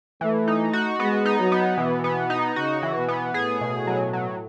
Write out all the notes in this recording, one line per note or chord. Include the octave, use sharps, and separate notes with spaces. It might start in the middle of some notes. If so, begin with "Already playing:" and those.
E3 A3
D#4
F#4
G#3 B3
D#4
F#3
B3
B2 E3
B3
D#4
C#3 F#4
E3
B2
B3
A2 G#4
B2
F#3
F#3